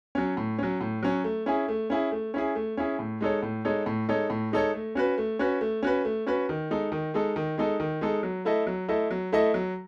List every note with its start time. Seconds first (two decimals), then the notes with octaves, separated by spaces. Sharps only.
0.15 F#3 C#4
0.37 A2
0.59 F#3 C#4
0.81 A2
1.03 F#3 C#4
1.24 A3
1.46 C#4 E4 G#4
1.68 A3
1.90 C#4 E4 G#4
2.12 A3
2.34 C#4 E4 G#4
2.55 A3
2.77 C#4 E4 G#4
2.99 A2
3.21 G#3 D#4 A4 C#5
3.43 A2
3.65 G#3 D#4 A4 C#5
3.86 A2
4.09 G#3 D#4 A4 C#5
4.30 A2
4.52 G#3 D#4 A4 C#5
4.74 A3
4.95 C#4 F#4 B4
5.18 A3
5.39 C#4 F#4 B4
5.61 A3
5.83 C#4 F#4 B4
6.05 A3
6.27 C#4 F#4 B4
6.49 D#3
6.70 G#3 D#4 A4
6.92 D#3
7.14 G#3 D#4 A4
7.36 D#3
7.58 G#3 D#4 A4
7.80 D#3
8.01 G#3 D#4 A4
8.23 F#3
8.45 A3 E4 A4 D#5
8.67 F#3
8.88 A3 E4 A4 D#5
9.11 F#3
9.32 A3 E4 A4 D#5
9.54 F#3